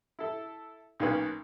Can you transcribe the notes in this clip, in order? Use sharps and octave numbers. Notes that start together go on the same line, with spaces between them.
E4 A4
B1 D#3 A#3 C#4 B4